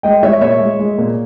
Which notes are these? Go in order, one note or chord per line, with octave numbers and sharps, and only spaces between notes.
G#3 D#5 G5
G#3 C#5 E5
A#2 C#5 E5
G#3
G#3
A#2